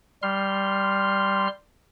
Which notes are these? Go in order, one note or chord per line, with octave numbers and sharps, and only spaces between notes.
G3 C6 F6